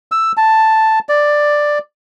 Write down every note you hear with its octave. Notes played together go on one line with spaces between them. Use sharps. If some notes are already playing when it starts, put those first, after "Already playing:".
E6
A5
D5